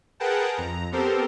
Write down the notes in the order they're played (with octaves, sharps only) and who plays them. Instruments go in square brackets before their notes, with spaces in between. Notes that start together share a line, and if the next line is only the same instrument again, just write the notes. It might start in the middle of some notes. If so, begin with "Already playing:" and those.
[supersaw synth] G#4 A#4 B4 F#5 G5 A5
F2 A#5
B3 C4 G4 A4 A#4 C5